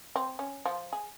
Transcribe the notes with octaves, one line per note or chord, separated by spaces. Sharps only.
C4
C#4
F3
G#4